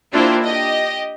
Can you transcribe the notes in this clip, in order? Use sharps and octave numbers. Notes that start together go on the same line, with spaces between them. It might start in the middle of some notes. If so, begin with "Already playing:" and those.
A#3 D4 E4 F4 G4 C5
G4 D#5